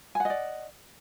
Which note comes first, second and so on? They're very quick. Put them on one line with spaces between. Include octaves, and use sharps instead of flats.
G#5 F#5 D#5 D5